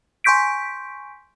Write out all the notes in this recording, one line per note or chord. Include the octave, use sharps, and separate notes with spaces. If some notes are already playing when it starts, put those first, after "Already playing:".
G#5 C6 C#6 G6 B6 D7